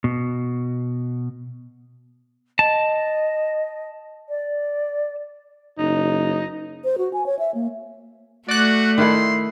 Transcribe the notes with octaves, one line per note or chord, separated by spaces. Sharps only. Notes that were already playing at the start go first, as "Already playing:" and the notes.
B2
D#5 A5
D5
F#1 D#4
C5
F#4
G#5
C#5
E5
A#3
A3 F#4 D5 F#6
D#3 E4 A4 C6